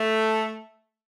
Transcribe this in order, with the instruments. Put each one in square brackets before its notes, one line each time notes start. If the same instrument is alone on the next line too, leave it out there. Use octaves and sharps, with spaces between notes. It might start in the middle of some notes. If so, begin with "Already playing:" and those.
Already playing: [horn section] A3